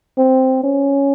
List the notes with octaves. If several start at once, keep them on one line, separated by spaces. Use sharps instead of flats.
C4
C#4